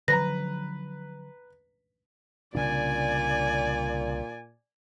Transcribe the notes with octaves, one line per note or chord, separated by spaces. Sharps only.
D3 F3 F#3 B4 A#5 A#6
C2 A#2 C#3 D4 D5 G#5